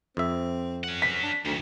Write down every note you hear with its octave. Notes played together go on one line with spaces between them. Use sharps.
F2 C4 E5
C#4 F#5
B6
D4
D2 D#3 F#3